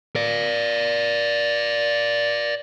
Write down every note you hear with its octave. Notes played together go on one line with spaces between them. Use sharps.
D5 F5